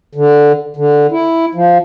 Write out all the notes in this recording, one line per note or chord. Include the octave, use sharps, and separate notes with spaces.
D3
D3
E4
F3